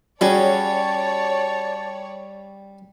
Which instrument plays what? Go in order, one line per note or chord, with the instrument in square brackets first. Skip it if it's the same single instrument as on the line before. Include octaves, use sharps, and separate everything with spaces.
[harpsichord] G3 [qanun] C#4 F#4 G#4 [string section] C#5 D5 [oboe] A5